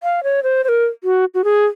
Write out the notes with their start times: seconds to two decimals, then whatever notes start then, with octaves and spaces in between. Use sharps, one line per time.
0.03 F5
0.24 C#5
0.43 C5
0.64 C5
0.69 A#4
1.04 F#4
1.34 F#4
1.44 G#4